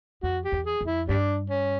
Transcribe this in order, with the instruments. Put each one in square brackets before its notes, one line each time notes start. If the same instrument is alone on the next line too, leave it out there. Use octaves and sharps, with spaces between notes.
[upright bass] F2 [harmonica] F#4
[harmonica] G4
[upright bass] E2
[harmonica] G#4
[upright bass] F2
[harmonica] E4
[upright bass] G2 [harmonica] G3 D4
[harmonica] C#4